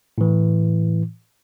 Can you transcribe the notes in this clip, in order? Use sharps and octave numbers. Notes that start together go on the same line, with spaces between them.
A2 E3